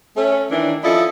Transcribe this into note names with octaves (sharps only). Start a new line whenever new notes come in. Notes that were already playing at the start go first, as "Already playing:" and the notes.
A3 C#4
D#3 E3 D4
F3 C#4 E4 A4 D5 D#5